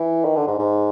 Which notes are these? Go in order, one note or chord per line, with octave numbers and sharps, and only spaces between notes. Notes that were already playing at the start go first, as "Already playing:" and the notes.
Already playing: E3
D#3
D3
G#2
G#2